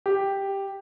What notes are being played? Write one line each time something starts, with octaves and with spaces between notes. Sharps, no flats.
G4